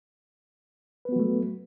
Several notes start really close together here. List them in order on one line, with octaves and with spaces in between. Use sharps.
B4 B3 F#4 F#3 A3